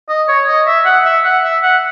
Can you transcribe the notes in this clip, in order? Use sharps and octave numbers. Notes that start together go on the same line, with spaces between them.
D#5
C#5
D#5
E5
F#5
E5
F#5
E5
F#5